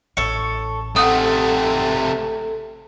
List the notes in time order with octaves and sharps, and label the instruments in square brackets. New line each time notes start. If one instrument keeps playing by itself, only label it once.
[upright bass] A1 [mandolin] A4 C#5
[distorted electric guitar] C3 A3 [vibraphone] A4 [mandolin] F#5 D#6